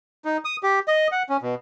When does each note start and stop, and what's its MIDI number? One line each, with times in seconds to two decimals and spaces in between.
0.25 0.37 63
0.45 0.56 87
0.63 0.79 67
0.88 1.07 75
1.12 1.23 78
1.29 1.37 61
1.42 1.55 47